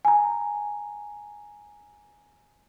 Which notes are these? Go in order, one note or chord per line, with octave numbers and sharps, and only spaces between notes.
G#5 A#5